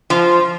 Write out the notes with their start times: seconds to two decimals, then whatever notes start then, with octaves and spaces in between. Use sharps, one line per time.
0.10 F3